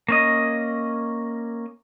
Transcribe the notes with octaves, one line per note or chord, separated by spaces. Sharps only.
A#3 C#4 D#5